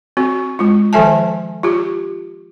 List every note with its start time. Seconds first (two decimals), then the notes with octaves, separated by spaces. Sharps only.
0.17 C4 F#4
0.59 G#3 F4
0.93 D#3 F3 A4 E5 G#5 A5
1.63 F4 G4